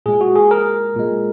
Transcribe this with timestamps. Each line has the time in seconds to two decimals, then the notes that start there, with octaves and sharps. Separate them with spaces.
0.06 A#2 G#3 G#4
0.21 F#4
0.36 G#4
0.51 A#4
0.96 A#2 G#3